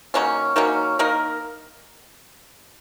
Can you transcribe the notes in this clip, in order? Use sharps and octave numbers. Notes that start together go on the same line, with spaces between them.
D#3 F#3 A#3 C#4
D#3 F#3 A#3 C#4
A#3 D#4 A#4